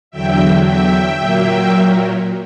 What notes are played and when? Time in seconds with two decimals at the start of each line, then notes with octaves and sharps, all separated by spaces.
0.11 E2 D3 F#3 E5 G5
0.65 E5 G5
1.19 A#2 F#3 A#3